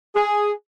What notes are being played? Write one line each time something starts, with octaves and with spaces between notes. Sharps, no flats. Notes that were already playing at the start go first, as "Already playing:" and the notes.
G#4